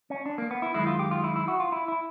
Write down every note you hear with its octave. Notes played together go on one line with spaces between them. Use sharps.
C#4
D4
A#3
B3
E4
F#2 D#3 G#3 E4
F4
G4
F4
E4
E4
F#4
F4
E4
E4